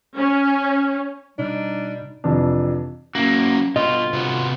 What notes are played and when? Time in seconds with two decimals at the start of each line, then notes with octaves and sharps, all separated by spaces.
0.16 C#4
1.39 B2 G3 D4 D#4
2.24 F2 C3 E3 D4
3.15 F#3 A#3 C#4 E4 F#4
3.76 G1 B2 F4 D#5
4.13 C3 B3 F#4